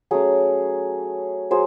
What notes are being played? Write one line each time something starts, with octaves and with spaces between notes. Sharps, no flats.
F#3 A3 C#4 G#4
F#3 G#4 C5